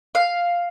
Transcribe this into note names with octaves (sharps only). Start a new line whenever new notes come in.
F5